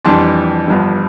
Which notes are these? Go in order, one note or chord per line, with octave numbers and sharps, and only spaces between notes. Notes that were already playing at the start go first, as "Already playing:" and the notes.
F2 E3 G3 D4 A5 C6
G1 G2 F3